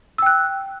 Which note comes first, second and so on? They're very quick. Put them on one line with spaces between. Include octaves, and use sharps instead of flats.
E6 G5 F#6